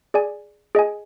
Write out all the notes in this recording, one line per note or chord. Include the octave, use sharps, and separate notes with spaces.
G#4 D5 G#5
G#4 D#5 G#5